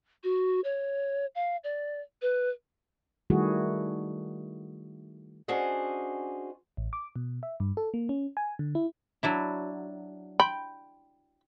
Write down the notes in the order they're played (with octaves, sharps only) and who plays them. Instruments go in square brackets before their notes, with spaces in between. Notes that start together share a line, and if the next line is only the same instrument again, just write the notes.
[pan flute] F#4
C#5
F5
D5
B4
[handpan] D#3 G3 A3 E4 F#4 G#4
[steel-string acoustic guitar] C#4 D4 F#4 G#4 C5 D#5
[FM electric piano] A1
D6
B2
E5
G2
A4
A#3
C#4
G#5
D3
E4
[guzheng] F#3 D4 E4
[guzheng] G5 [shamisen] B5